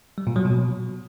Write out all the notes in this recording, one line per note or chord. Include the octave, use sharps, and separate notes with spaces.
G3
A#2
F#3
B2